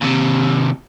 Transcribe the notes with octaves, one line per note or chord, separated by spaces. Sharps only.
D#2 C3